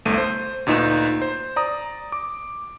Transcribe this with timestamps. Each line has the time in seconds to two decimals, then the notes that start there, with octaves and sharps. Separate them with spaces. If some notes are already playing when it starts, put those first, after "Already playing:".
0.05 G1 C2 A3 D#7
0.18 C5
0.67 D2 A#2 D#4 B4 E7
1.22 C5
1.56 D5 A#5 D#6
2.12 D6